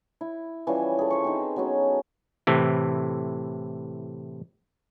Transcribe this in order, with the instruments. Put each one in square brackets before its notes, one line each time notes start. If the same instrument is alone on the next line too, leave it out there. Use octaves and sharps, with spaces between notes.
[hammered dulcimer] E4
E3 F3 G3 C#4
G#4 A4
C5 C#6
C4 D#4
F#3 B3 C#4
[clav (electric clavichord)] A2 C3 E3